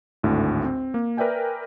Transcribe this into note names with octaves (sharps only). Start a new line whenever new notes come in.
G#1 D2 A2 D3
C4
A#3
A#4 B4 D5 E5 G5 G#5